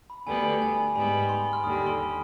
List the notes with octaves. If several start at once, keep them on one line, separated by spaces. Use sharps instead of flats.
B5
D2 D3 G3 B3 G#5
G#5
G#2 G3 B3 B5
B5
C6
F6
D#2 D3 G3 D#6
C6